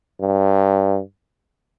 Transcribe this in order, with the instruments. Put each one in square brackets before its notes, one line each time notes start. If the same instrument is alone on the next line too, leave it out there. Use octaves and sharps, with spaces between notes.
[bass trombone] G2